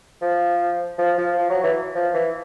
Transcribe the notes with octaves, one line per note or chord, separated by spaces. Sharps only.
F3
F3
F3
F3
F#3
E3
F3
E3